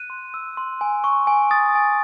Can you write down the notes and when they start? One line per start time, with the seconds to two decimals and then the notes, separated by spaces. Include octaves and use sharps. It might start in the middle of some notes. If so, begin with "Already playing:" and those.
Already playing: F#6 D#7
0.10 C6
0.34 E6
0.57 C6
0.81 G#5
1.04 C#6
1.27 G#5
1.51 D#6 A6
1.75 G#5